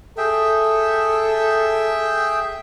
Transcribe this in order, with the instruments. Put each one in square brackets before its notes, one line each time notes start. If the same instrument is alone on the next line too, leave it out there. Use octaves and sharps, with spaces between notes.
[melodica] G#4 E5 G5 [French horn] A4